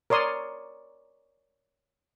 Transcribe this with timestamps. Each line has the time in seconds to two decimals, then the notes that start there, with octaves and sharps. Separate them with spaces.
0.10 A#4 C#5 D5 C6 D#6